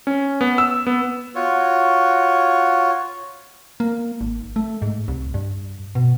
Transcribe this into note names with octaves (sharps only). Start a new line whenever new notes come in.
C#4
B3
E6
B3
F4 F#4 C#5
A#3
G#1
A3
G#2
C2
G2
B2